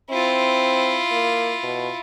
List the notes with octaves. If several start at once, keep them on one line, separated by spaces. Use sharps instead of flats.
C4 E4 F4
A#3
B2